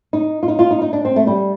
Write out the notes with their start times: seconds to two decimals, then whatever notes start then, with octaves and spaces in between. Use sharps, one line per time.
0.13 D#4
0.43 F4
0.48 D#4
0.59 F4
0.71 D#4
0.82 D#4
0.93 D4
1.05 C4
1.16 A3
1.27 G3